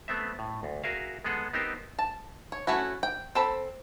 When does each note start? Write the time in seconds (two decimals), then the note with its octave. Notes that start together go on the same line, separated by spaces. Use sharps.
0.08 A3 B3 C4 E5
0.39 A2
0.63 D2
0.84 F#4 G#4 A#4 E5 F5
1.24 G#3 B3 G#4 A4 F#5
1.53 B3 C4 D#4 G4 A#4 C5
1.99 A5
2.52 C#5
2.67 A3 C#4 E4 F#4
3.03 G5
3.35 C4 A4 B5